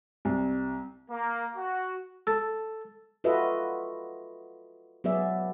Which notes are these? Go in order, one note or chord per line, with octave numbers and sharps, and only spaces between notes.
C2
A#3
F#4
A4
F4 F#4 A4 B4 D#5 E5
F#3 B3 G#4 D5 E5